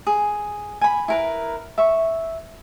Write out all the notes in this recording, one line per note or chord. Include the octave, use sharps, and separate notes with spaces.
G#4
G#5 B5
E4 A#4 B4
E5 C#6